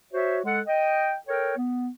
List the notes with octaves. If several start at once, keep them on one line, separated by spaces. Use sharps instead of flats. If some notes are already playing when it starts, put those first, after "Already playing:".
F#4 C5 C#5 E5
G#3 A4 F#5
D#5 G5
A4 A#4 C#5 G5
B3